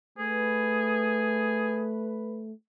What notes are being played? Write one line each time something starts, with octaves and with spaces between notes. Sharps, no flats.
A3 G#4 B4